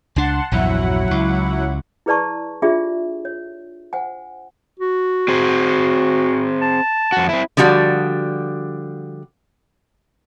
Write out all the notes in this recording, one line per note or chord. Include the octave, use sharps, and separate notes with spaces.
C#2 D4 F#5 A5 C6
A#1 E2 G2 F#3 E4 F#5
C#2
E4 G#4 B4 D5 A5 C#6
D4 F4 G4 G#4 D5 E5
C#5
C5 F#5 G#5
F#4
C4 G#4 C5
A5
F2 F#4
C4 E4
D3 F3 G3 F#4 D5